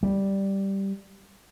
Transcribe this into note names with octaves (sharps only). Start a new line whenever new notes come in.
G3